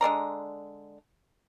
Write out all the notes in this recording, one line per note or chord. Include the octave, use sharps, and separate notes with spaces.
D3 G#3 D5 A#5